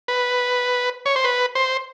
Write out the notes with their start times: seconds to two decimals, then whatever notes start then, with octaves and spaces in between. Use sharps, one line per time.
0.08 B4
1.06 C#5
1.16 C5
1.24 B4
1.55 C5